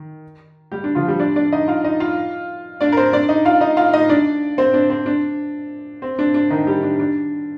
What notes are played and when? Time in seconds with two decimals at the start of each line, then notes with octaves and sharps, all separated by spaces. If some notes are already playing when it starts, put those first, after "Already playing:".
Already playing: D#3
0.72 G3 G4
0.84 D4
0.95 F3 F4
1.08 G3 G4
1.19 D4 D5
1.36 D4 D5
1.53 D#4 D#5
1.68 F4 F5
1.85 D#4 D#5
2.00 F4 F5
2.81 D4 D5
2.92 A#4
2.97 C4 C5
3.13 D4 D5
3.29 D#4 D#5
3.45 F4 F5
3.61 D#4 D#5
3.77 F4 F5
3.93 D#4 D#5
4.09 D4 D5
4.58 C4 C5
4.74 D4
4.90 C4
5.06 D4
6.02 C4
6.19 D4
6.34 D4
6.50 D#3 D#4
6.67 G3 G4
6.82 D4
7.00 D4